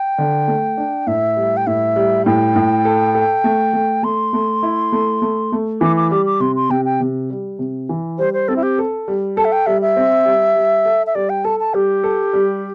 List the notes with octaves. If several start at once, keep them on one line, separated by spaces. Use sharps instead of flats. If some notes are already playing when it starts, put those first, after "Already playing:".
Already playing: G5
D3
A3
D4
A2 E5
G3
G5
A2 E5
G3
A2 G5
A2
A4
A4
A3
A3
A3 C6
A3
E4
A3
A3
A3
E3 D6
D6
G3 D6
D6
C3 C6
C6
C3 G5
G5
C3
G3
C3
E3
G3 C5
C5
C4 A4
E4
G4
A4
G3
A4 A5
E5
G5
G3 E5
E5
C4
G3
G3
A4
E5
G3 D5
G5
A4 A5
A5
G3 G4
A4
G3